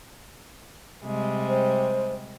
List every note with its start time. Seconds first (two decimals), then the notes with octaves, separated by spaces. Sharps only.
1.04 C3 G3 G#3
1.49 C5